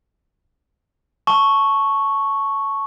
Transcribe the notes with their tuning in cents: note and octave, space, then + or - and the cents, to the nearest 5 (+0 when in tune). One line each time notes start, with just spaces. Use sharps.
A5 +0 C#6 +0